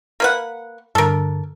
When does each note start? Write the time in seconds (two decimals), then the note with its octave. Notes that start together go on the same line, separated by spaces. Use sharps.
0.20 A#3 B4 F#5
0.95 G2 D3 A4 A#4